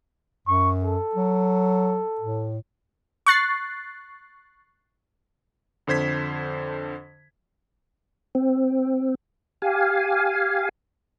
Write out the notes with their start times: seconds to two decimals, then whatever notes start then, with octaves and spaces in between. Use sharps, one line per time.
0.48 F#2 C#6
0.84 A4
1.15 F#3
2.21 A2
3.26 C#6 F#6 A6 C7
5.87 F2 D3 C5 G#6 B6
8.35 C4
9.62 G4 F5 G#5